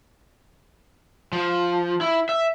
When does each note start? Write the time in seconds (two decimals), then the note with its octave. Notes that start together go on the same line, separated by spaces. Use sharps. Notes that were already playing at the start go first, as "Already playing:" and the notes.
1.33 F3
2.01 E4
2.29 E5